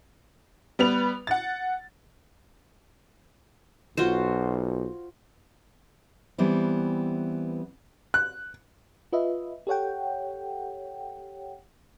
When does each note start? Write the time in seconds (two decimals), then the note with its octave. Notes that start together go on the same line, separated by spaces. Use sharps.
0.79 G3 B3 B4 F7
1.27 F#5 A6
3.97 B1 F4 F#4 C5
6.38 E3 G3 B3 C4 E4
8.14 F#6
9.13 F4 B4 D#5 E5
9.67 G4 A4 C#5 F#5 G5